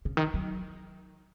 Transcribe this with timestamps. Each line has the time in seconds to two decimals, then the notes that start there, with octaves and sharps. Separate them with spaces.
0.05 C#3
0.17 D#3
0.34 F#3